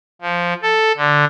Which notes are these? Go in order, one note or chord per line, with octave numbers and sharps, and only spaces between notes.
F3
A4
D3